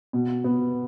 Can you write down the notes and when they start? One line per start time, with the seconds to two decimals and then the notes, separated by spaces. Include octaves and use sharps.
0.13 B2
0.44 B3